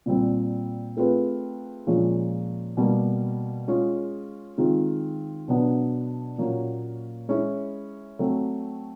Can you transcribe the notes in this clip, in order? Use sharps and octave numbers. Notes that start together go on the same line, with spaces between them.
A#2 G3 C4
A3 C4 F4 G#4 B4
A#2 F3 G#3 C#4
B2 G3 A#3
G#3 C#4 F4 G#4
D#3 G#3 C4 F4
B2 F#3 B3 D4
A#2 F#3 A#3 C#4
G#3 C#4 E4
F#3 A3 C4